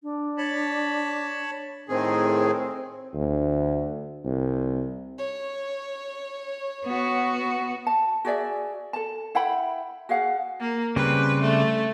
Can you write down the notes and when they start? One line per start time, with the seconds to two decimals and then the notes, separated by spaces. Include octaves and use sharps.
0.03 D4
0.38 C#5 A5 B5
1.89 A2 D#3 C4 G#4
3.14 D2
4.25 C2
5.19 C#5
6.85 B3 F#4
7.87 A5
8.25 F#4 G#4 D5 E5
8.93 A4 A5
9.35 E4 F#5 G5 B5
10.09 F#4 G#4 F5 F#5
10.60 A#3
10.96 C#3 G3 C4 B4
11.41 A3